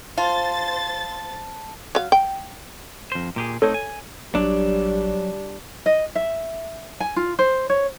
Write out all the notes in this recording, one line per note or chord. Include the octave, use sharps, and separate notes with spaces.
F4 C5 A5 A6
F#3 F5
G5
F2 C5
A#2 G4 G#4
A3 C4 D#4 A4 C#5
G#5
A1 F#3 G3 D4
D#5
E5
G#5
F4
C5
C#5